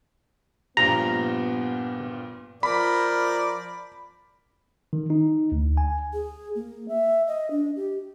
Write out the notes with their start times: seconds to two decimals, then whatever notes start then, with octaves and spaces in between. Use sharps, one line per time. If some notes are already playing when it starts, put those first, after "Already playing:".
0.77 G2 A#2 F3 B3 A#5
2.63 F3 A#4 D5 B5
4.93 D#3
5.10 D#4
5.52 D2
5.77 G#5
6.13 G#4
6.55 A#3
6.88 E5
7.27 D#5
7.51 D4
7.76 G4